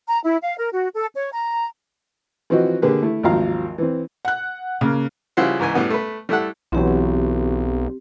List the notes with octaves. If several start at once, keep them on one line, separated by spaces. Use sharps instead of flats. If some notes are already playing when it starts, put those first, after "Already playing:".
A#5
E4
F5
A#4
F#4
A4
C#5
A#5
E3 F3 C4 F#4 D#5
D3 A#3 G4 G#4 B4
A3 E4
G#1 D#2 F3 F#3 F5 A#5
E3 C4
F#5 F#6
C#3 A#3
C#3 F3 G3 E4 F#4 C5
C#2 G#2 E3 G#5
A2 G3 B3 F#4
A3 B4
G3 A3 E4 A4 F#5
B1 E3 F#3 C4 G4